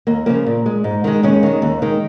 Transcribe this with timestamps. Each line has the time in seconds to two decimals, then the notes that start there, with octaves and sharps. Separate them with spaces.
0.07 D#2 A#3
0.26 C#3 F3 A#3
0.46 A#2
0.66 G#3
0.84 G#2
1.04 D#3 G#3
1.23 D#2 G#3 C#4
1.43 D#3 G#3
1.62 D#2
1.82 D#3 G#3